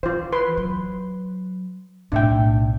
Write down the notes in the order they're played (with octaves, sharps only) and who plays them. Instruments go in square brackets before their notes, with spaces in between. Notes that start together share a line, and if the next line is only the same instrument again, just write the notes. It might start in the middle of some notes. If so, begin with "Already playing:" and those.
[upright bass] E3 [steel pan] F4 C5
[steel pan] B4 C6
[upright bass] F#3
[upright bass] B1 A2 [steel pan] D4 E5 G5